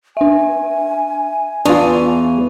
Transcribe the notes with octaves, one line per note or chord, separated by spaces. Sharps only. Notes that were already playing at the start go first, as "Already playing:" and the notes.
D4 E5 G#5
E2 D4 F4 C#6 D#7 F7